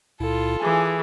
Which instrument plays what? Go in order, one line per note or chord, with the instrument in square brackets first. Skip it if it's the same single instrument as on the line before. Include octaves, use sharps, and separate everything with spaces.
[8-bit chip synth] C#2 A#2 E4 [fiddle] F4 A4
[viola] E3 G#4 [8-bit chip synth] G#5 D6